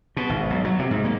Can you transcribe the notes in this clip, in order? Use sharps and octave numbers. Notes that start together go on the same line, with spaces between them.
B2
G#1
B1
F#3
C3
G#2
A#3